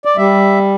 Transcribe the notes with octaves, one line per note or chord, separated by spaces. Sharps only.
D5
G3 E5